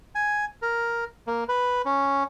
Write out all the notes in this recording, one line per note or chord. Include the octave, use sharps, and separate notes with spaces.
G#5
A#4
A#3
B4
C#4